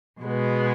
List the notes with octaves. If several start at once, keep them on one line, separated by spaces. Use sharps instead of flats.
B2 G#3 B3